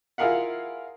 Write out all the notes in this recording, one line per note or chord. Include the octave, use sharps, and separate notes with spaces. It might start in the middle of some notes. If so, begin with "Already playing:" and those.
E4 F4 G#4 A#4 F5 F#5